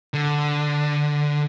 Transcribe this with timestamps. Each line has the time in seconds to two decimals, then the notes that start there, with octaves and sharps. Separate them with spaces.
0.14 D3